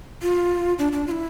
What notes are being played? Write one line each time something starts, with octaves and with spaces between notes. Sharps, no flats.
F4
D4
D4
F4
E4